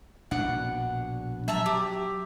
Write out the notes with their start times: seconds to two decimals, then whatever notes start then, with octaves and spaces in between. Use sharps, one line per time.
0.31 A#1 B2 D4 F#5
1.48 F#3 E5 A5 A#5
1.66 G4